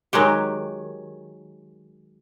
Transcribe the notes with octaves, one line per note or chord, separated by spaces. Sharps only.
D#3 F#3 G#3 G4